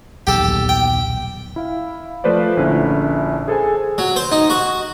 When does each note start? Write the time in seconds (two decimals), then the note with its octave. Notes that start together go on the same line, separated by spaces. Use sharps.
0.27 D#1 B1 E2 G4 A4
0.69 G5
1.56 E4 F5
2.24 F3 A3 B4 C5 D5
2.57 A#1 D3 C#4 E4 E5 F#6
3.48 G#4 A4 C5 G#5
3.98 F#3
4.16 C5
4.32 D#4
4.50 F#4